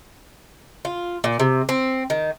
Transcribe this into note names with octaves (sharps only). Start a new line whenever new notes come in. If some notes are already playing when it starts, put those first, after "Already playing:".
F4
A#2
C3
C4
D#3